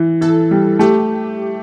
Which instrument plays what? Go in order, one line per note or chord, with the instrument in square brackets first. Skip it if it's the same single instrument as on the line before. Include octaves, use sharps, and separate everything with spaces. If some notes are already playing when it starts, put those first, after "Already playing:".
Already playing: [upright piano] E3
[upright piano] E3 [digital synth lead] A4
[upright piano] G3
[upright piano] A3 [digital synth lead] G4